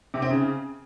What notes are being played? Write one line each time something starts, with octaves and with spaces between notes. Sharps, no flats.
C3
C4
C#3